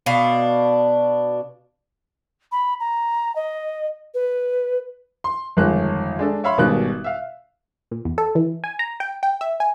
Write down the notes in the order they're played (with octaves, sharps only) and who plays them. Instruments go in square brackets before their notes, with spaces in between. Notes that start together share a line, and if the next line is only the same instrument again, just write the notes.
[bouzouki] B2 D4 F5
[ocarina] B5
A#5
D#5
B4
[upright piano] C6
G1 F2 D#3 G#3 F#6
G#3 D4 A4
C#5 E5 F5 B5 C6
G#1 B2 D#3 G3 G#3 F#6
E5 F5
[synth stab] A#2
E2
A4
E3
G#5
A#5
G5
G5
E5
G#5